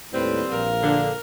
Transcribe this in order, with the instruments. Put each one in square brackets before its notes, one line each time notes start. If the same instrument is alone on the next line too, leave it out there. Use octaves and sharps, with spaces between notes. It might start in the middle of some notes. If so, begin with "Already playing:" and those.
[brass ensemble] D#2 A2 [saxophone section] G3 C4 [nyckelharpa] B4
[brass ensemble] A#1 F5 [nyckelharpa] A#4
[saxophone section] D3